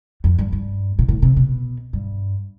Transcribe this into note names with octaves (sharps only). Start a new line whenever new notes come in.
F2
G2
G2
B2
A2
C3
B2
G2